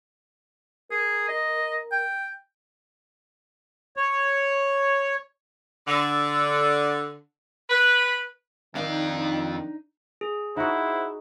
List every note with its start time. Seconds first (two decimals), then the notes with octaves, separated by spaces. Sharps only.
0.91 G#4 A#4
1.29 D#5
1.92 G5
3.97 C#5
5.87 D3
7.70 B4
8.75 F2 D#3 D4 D#4 F5
10.21 G#4
10.56 D#4 E4 F#4 C5 F#5